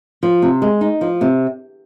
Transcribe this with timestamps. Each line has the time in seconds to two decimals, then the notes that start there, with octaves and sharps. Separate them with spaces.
0.23 F3
0.42 C3
0.62 G#3
0.81 D#4
1.01 F3
1.21 C3